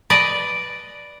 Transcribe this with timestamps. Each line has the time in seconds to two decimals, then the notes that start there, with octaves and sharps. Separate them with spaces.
0.10 B4 D5 D#5